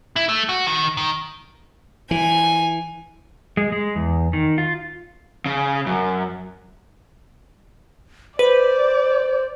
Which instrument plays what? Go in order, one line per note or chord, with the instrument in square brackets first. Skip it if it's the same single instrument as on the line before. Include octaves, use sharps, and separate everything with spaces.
[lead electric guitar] E4
A3
F#4
D#3
D#3
[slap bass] E3 [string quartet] G#5
[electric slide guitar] G#3
G#3
E2
D#3
F4
[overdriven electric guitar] C#3
F#2
[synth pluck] B4 [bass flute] C5 [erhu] D5